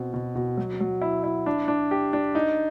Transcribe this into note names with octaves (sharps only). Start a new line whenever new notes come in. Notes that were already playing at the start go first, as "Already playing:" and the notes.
Already playing: B2 C4
B2
B2
F#3
F#3
E4
E4
D4
D4
G4
D4
D#4